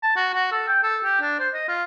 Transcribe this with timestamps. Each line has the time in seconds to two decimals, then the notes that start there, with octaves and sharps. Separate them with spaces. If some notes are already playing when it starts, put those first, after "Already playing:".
0.03 A5
0.16 F#4
0.34 F#4
0.51 A4
0.68 G5
0.83 A4
1.04 G4
1.21 D4
1.39 C5
1.54 D#5
1.68 F4